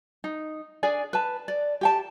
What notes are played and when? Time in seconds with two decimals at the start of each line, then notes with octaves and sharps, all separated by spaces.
0.24 D#4
0.83 D4 G#4 D5 G#5
1.13 B4 A5
1.48 D5
1.81 G4 G5 A5